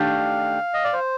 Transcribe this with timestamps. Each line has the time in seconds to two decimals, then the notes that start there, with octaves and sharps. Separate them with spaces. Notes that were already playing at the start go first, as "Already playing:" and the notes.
Already playing: D#3 A3 D4 G4 F5
0.74 D#5
0.84 D5
0.93 C5